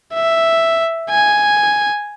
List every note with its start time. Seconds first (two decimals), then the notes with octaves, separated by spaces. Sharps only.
0.14 E5
1.10 G#5